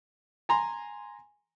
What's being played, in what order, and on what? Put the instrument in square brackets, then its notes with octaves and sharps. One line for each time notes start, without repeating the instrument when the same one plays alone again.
[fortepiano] G#5 A#5 C6